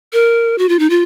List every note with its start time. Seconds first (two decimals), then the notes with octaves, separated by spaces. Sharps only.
0.13 A#4
0.58 F#4
0.69 F4
0.79 D#4
0.90 F4